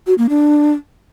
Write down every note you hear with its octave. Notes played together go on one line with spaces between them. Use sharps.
F#4
A#3
D4